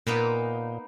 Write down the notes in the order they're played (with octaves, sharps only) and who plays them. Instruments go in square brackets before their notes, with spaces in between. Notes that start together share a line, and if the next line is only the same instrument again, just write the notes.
[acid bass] A#2 [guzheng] A#3 B3 D#4